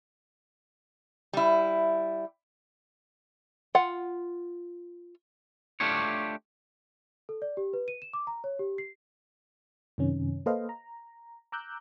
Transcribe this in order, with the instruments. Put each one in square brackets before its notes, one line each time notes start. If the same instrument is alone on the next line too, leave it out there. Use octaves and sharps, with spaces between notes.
[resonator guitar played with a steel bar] G3 E4
[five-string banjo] F4 F#5
[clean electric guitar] A3 D4 F4 G4 C#5
[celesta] A4
D5
G4
B4
D#7
E7
D6
A#5
C#5
G4
C7
[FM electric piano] F#2 C3 D#3 C#4
A#3 A4 B4 C5 D#5 F5
A#5
A#5 D6 E6 F#6 G6